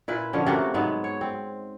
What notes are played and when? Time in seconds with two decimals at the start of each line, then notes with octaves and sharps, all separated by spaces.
0.08 A#2 E4 B4
0.33 D3 F3 C#4
0.47 C3 A3 A#3 F#4
0.74 G#2 F#3 G#3 B3
1.04 C#5
1.21 C4